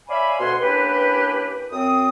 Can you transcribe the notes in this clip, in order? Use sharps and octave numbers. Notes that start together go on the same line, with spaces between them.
C#5 D5 E5 F5 G#5 B5
D2 B2 F#5 G#5 C6
A#3 C#4 D4 E4 G4 B4
F#2 C4 D#6